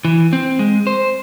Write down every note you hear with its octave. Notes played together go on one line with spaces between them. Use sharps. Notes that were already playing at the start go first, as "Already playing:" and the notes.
E3
C4
G#3
C5